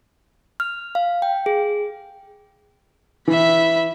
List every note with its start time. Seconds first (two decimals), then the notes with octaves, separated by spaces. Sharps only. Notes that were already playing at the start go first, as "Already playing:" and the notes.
0.60 F6
0.95 F5
1.22 G5
1.46 G#4
3.28 E3 E5 B5